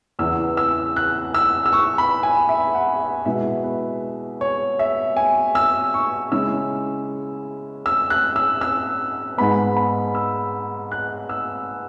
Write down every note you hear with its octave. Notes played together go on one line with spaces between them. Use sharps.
E2 C#3 E3 B3 E4 E6
E6
F#6
E6
E6
C#6
B5
G#5
E5
F#5
E5
B2 G#3 B3 E4 E5
B4
C#5
E5
G#5
E6
C#6
C#3 G#3 C#4 E4 E6
E6
F#6
E6
E6
G#2 G#3 B3 B5
B5
E6
F#6
E6